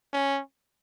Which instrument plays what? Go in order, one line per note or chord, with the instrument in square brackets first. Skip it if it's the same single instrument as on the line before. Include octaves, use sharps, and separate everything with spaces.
[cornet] C#4